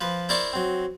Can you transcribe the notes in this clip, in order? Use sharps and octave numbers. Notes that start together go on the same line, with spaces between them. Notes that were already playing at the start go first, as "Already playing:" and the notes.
F3 B4
E4 A#4 C5 D5 A5 C#6
F#3 C4